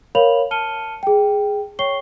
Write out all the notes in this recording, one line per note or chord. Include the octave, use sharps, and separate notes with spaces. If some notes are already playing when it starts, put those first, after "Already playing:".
A#4 C#5 F5 B5 F7 F#7
A5 F6 C#7 D#7 G7
G#4 G5
C#5 G5 C#6 C7 G7